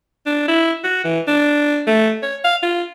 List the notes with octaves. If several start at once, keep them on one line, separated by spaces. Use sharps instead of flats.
D4
E4
F#4
E3
D4
A3
C#5
F5
F4